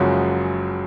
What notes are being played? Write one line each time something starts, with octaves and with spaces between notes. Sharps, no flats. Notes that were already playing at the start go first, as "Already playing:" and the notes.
Already playing: F#1 F#2 C#3 F3 G#3 F#4